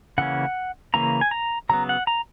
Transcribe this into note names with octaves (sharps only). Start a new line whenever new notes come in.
C#3 E3 A#3 C#4 F#5
C#3 E3 A#3 C#4 A#5
G#5
A#5
C#3 F#3 B3 A#5
F#5
A#5